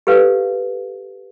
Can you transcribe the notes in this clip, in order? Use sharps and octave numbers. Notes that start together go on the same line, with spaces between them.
G4 A4 B4 F5